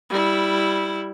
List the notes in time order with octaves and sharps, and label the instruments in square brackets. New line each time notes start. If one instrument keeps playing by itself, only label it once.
[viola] G3 E4